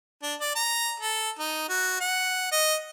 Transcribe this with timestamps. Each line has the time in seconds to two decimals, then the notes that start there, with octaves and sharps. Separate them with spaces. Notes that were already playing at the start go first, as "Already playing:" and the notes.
0.23 D4
0.40 D5
0.56 A#5
1.00 A4
1.39 D#4
1.69 F#4
2.00 F#5
2.52 D#5